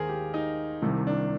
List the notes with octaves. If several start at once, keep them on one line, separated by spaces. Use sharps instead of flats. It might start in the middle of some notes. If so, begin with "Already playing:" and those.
Already playing: D#2 D#3 G#4 A#4 C5
G4
D#4
C2 C3 D#3
D4